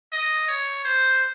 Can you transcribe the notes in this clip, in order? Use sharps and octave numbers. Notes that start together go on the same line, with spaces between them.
D#5
C#5
C5